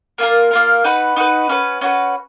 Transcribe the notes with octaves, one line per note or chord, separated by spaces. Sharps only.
A#3 F4 A#4
A#3 F4 A#4
D#4 F#4 B4
D#4 F#4 B4
C#4 F#4 B4
C#4 F#4 B4